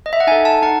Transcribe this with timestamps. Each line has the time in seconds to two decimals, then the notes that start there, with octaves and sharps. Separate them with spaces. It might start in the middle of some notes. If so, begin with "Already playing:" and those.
0.06 D#5
0.13 E5
0.20 F#5
0.27 D#4 G#5
0.31 A4
0.45 A5
0.62 D#4 F#5